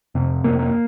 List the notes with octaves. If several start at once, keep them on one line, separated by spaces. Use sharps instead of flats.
F2 C3
F2 C3 A#3
A#3